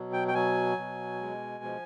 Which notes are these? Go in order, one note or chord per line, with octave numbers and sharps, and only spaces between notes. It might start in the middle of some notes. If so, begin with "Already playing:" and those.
Already playing: B2 F#3
G5
G5
F#3 G#5
B2
G#3
F3